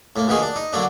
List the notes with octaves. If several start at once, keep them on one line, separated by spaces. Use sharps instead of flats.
A2 A#3
A#1 B2 D#3 A#3 G#4
D4
D#4
D3 F#3 A#3 D4